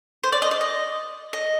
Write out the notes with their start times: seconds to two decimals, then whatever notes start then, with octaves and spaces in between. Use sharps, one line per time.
0.23 C5
0.32 D5
0.42 D#5
0.51 D5
0.61 D#5
1.33 D#5